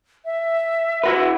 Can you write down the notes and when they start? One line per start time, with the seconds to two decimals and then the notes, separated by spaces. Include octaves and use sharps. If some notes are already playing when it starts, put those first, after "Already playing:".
0.25 E5
1.04 E4 F#4 B4